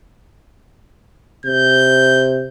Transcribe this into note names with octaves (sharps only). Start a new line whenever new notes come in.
C3 G6